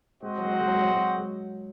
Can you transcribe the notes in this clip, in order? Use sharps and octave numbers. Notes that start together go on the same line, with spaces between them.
G#3 C4 F#4 C5 D#5 F#5
F#3
G#3
F#3
G#3
F#3
G#3
F#3
G#3
F#3
G#3